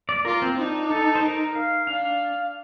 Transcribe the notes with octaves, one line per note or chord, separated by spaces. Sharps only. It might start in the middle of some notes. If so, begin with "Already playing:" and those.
D5
F4 A#4
C4
D4 D#4
A4
C5
A#4
F5
D4 F5